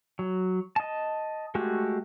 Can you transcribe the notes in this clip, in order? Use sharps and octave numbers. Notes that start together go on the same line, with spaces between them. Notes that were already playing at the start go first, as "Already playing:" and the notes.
F#3
D#5 A5
G#3 A3 F#4 G4